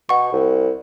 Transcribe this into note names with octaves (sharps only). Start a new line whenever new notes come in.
B2 F#5 C#6
C2